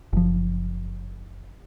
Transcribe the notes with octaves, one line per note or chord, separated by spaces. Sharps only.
F#1 F3